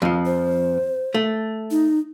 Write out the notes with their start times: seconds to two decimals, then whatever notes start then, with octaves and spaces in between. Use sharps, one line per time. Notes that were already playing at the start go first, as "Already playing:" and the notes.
0.02 F2 F3
0.26 C5
1.14 A3
1.71 D#4